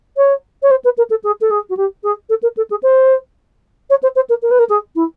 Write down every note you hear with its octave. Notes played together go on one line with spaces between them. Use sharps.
C#5
C#5
C5
B4
A#4
A4
G#4
A4
G#4
F#4
G4
G#4
A4
A#4
A4
G#4
C5
C#5
C5
C5
A#4
A#4
B4
A#4
G#4
E4